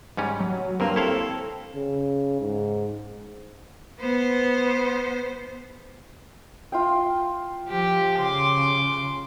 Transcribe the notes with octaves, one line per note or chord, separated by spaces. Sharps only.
G#2 G3 C#4
F#3
G2 A#3 C4
E4 A4 C#5 F5
C#3
G#2
B3 C5
F4 F5 G5
F3 G4
C#3 C6 D6